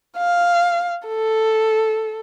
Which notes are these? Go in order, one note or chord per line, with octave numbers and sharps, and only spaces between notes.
F5
A4